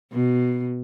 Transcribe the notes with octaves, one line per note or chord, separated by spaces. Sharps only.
B2